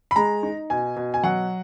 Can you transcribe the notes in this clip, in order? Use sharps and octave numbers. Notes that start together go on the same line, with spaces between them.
B5
G#3 A#5
D#4
B2 G#5
B2
G#5
F#3 F#5